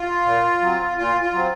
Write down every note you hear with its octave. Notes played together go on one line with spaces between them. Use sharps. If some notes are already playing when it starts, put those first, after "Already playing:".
Already playing: F4
A#2
F#3 C4
A#2 F4
F4
F#3 C4